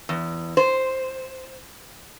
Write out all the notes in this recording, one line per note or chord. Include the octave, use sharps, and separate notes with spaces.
E2
C5